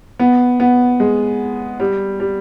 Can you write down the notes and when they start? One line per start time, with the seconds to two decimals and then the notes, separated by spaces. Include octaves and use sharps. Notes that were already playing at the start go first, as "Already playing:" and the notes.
0.19 B3
0.60 B3
1.00 G#3
1.80 G3
2.20 G3